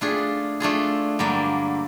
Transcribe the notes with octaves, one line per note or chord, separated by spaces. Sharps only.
A3 D4 F4 G#4
A3 D4 F4 G#4
G2 D3 F#3 A#3